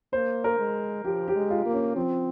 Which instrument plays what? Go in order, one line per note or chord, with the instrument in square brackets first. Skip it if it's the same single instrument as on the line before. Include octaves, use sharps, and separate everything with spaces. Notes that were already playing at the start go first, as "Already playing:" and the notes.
[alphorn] A#3 [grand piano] C5
[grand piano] A#4
[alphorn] G#3
[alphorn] F3 [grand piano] G4
[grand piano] G4
[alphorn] G#3
[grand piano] F4
[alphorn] A#3
[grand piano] C#4
[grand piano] F3 [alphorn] C4